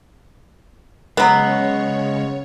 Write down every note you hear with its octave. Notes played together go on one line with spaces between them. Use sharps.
C#3 F#3 G#3 B3 C#5